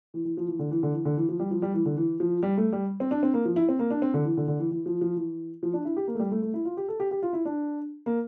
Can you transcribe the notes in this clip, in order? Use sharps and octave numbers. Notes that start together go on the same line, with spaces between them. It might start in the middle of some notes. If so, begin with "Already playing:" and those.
E3
E3
F3
E3
D3
E3
D3
E3
D3
E3
F3
G3
F3
G3
E3
D3
E3
F3
G3
A3
G3
C4
D4
C4
A#3
F3
E4
C4
A#3
D4
C4
D3
E3
D3
D3
E3
E3
F3
F3
E3
F3
D4
E4
G4
A#3
A3
G3
A3
A3
E4
F4
G4
A4
G4
G4
F4
E4
D4
A#3